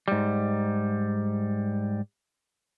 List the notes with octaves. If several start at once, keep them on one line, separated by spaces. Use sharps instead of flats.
G#2 G3